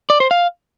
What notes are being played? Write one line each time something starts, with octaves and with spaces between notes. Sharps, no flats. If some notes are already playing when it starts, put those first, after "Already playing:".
D5
C5
F5